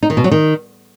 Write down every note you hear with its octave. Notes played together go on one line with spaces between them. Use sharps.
D#4
D#3
B2
F#3
D#3